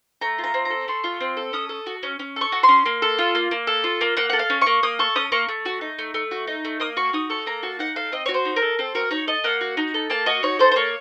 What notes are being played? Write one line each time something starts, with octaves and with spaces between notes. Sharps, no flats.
A3 A#5
F4
A#5
C4
A#5
A4
A3 C6
F4
C4
A4
C#4 D#6
A4
F#4
C#4
C#4
A4 C#6
F#4
C6
C#4
A#3
A4
F4
A#3
A#3
A4
F4
A#3
A#3 F#5
A4 F#5
F5
C#4
A#3 C#6
A#3 D#6
A4 C#6
C#4 D#6
A#3 C#6
A3
F#4
D#4
A3
A3
F#4
D#4
A3
A#3 D#6
F#4 C#6
D#4 D#6
A4 C#6
A#3 A#5
F#4 A5
D#4 F#5
A4 F5
C4 D#5
F#4 C#5
C5
D#4
A#4
A4
C4 A4
F#4 A#4
D#4 C#5
A4 D#5
A#3 F#5
F#4
D#4
A4
A#3 A5
F#4 D#5
D#4 C#5
A4 C5
C5
A#3 C#5